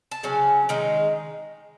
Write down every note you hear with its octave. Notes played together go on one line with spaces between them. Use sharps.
A5
C#3 F#3 C#4
D#3 G#3 D#4